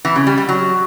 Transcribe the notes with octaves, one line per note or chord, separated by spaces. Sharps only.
E3
C#3
G3
G3
F#3